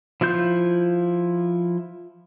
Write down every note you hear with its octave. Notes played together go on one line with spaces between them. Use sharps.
F3 E4 F4 G6